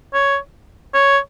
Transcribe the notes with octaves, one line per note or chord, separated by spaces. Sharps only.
C#5
C#5